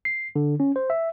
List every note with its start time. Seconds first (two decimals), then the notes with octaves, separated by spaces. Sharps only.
0.05 C7
0.36 D3
0.60 C#4
0.76 C5
0.90 E5